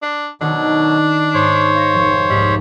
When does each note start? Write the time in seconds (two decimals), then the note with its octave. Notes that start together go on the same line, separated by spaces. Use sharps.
0.03 D4
0.41 B2 D#3 F#3 D4 D#4
1.34 G#2 C5 C#5
1.75 F5 C#6 A#6
1.94 F1 C#6
2.30 C2 G#2 G3